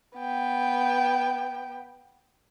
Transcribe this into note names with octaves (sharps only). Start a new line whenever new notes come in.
B3 G5